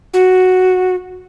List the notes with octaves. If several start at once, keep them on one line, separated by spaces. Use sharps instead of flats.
F#4